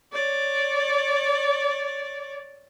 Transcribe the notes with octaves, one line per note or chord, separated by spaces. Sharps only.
C#5 D5